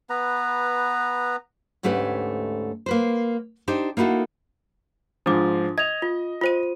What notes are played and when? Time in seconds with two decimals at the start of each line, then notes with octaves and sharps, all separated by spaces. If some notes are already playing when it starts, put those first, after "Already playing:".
0.10 B3 B4 A#5
1.83 D2 G#2 A3 C#4 G4 B4
2.86 A#3 B4 C5
3.68 D4 D#4 G4 C5
3.97 A#3 D#4 E4 F#4 A4
5.26 G#2 F3 D4 D6
5.78 D#5 G#6 F7
6.02 F4
6.41 F4 C5 D#7